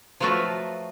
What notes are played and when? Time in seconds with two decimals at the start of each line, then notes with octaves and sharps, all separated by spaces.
0.20 F3 F#3 A3 F4 F#4 B4